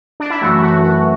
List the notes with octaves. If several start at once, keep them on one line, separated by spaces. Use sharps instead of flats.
D4
E4
F#2 E3 A3 F#4
F#4
F#4